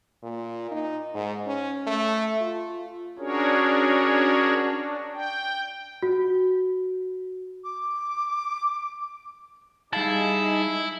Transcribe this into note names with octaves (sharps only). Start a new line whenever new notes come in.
A#2
D#4
G#2
C#4
A3
F4
C#4 D4 F#4 G#4 A#4 C#5
D4
G5
F#4
D6
G3 D#4 E4 G#4 F5 A5